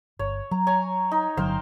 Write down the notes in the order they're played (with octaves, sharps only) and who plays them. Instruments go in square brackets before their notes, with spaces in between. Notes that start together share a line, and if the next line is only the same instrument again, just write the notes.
[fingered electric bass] G1 [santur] C#5
[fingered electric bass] F#3 [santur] A#5
[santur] C#5 G#5 A#5
D#4
[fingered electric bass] G1 D3 F#3 [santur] C5 F5 G5